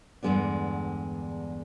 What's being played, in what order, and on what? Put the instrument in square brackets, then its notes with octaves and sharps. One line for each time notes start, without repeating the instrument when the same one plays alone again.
[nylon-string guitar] E2 G2 D3 G#3 B3 D4